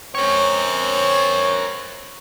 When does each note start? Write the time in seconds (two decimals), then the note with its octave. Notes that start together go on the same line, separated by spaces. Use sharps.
0.15 C4 C#4 A#4 C#5